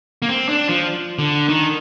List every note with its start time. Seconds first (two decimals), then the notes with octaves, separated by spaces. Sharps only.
0.22 A#3
0.28 C4
0.48 D4
0.68 F3
1.19 D3
1.49 D#3